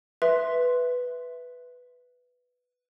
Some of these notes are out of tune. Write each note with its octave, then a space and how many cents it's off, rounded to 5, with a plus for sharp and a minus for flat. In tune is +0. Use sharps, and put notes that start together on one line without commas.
B4 +0 E5 +0 C6 +0